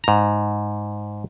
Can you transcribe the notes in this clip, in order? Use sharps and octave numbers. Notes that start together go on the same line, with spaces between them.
G#2 A#5